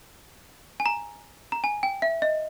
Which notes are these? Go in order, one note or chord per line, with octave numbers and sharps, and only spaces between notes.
G#5
A#5
A#5
G#5
G5
E5
D#5